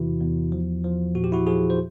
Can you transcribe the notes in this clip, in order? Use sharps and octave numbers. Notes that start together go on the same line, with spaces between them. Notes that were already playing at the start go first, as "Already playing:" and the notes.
Already playing: E2 C3 E3 E4 F#4
E2
F3
F3
A#2 F#4
G4
E4 F#4
F3 F#4 G#4
C5